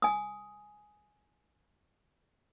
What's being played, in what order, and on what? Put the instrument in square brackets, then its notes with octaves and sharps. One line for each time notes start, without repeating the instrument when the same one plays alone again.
[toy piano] G#5 D#6